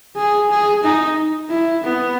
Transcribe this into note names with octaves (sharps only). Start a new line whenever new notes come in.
G#4
G#4
D#4
E4
B3